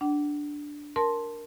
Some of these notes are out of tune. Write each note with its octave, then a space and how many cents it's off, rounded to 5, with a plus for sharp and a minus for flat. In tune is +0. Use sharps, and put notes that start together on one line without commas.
D4 +0 F#5 +35
A#4 +0 A5 -5 C6 +0